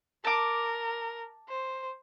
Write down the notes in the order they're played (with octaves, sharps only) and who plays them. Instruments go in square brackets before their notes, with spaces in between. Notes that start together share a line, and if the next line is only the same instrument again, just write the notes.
[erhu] A#4 [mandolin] A5 D6
[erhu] C5